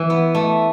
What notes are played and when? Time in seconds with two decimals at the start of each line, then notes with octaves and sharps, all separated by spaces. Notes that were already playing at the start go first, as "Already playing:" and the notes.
Already playing: E3
0.10 B3
0.35 A3